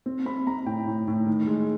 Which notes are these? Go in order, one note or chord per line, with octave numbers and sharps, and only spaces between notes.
C4
C4 B5
C4 A#5
A2 G5
A2
A2
D#3
G#3